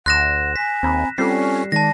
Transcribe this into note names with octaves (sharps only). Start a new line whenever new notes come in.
D2 F#5 C6 F#6 A#6 E7
G#5 B6
D#2 C4 A#5 B5
G3 C4 C#4 F4 A4 C7
D#3 G#3 D5 A5 A#6